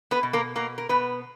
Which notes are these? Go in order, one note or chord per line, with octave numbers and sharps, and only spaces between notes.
B3 B4
B2
A#3 A#4
B2 A#3 A#4
A#4
B2 B3 B4